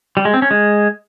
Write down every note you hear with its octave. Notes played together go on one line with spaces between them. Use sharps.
G3
G#3
C4
C#4
G#3